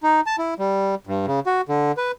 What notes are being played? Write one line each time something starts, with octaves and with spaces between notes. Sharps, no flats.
D#4
A5
E4
G3
G2
C#3
F#4
D3
B4